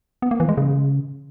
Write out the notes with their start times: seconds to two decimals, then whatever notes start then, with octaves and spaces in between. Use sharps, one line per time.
0.22 B3
0.31 A#3
0.40 E3
0.49 G#3
0.58 C#3